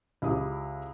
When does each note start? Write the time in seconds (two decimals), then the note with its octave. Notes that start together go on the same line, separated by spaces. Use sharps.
0.22 C#2 E4 G4 D#6